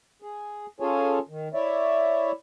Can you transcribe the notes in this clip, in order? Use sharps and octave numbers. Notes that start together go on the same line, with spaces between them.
G#4
C#4 F4 G#4 A4 C#5 G#5
D#3
E4 C#5 D5 E5